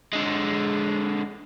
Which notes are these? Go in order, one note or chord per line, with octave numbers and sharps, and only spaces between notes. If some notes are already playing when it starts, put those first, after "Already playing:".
D3 G#3